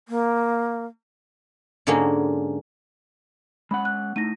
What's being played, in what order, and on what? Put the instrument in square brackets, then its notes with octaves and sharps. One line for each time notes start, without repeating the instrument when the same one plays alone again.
[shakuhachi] A#3
[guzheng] G#2 D3 G#3 A#3 C#4 F#4
[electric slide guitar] G#3 C#4 F#5 [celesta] B5
[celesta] F#6
[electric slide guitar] A3 D#4 [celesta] E4 A#6 D#7